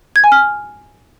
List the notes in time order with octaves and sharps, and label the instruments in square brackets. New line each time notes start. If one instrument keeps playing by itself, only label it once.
[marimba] G#6
G#5
F6